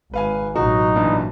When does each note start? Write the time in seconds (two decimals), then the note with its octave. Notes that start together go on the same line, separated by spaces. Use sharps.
0.14 G#1 B4 F5 G#5
0.56 A1 B2 F#3 D#4 F#4
0.96 G2 A#2 E3